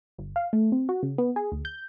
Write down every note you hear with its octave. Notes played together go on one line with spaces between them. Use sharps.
G1
F5
A3
C4
F#4
C#3
B3
G#4
D2
G6